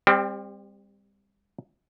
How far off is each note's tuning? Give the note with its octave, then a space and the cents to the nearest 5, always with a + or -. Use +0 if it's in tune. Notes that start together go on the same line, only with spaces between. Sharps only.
G3 +35 C4 +0 G4 +0